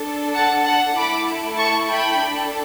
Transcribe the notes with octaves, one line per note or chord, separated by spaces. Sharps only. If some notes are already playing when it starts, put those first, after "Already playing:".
Already playing: D4 A4
F#5 A5
F#5 A5
A3 E4 A4 B5 D6
A5 C#6
G5 B5
D4 A4